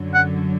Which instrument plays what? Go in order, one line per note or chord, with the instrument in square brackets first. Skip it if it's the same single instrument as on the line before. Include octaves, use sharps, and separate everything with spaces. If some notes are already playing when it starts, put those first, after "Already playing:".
Already playing: [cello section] F#2 D3 F#3
[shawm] F#5